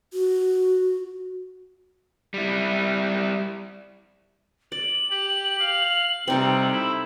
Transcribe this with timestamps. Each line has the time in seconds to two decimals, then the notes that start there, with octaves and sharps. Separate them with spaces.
0.13 F#4
2.34 G3 E4
4.72 D5 F#7
5.10 G4
5.59 F5
6.28 C3 G3 C4 D#4 A4
6.72 E4